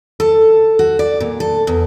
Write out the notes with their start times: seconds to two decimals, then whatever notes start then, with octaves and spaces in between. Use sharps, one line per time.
0.20 A4
0.79 F#4
0.99 D5
1.20 A#2
1.40 A4
1.67 E2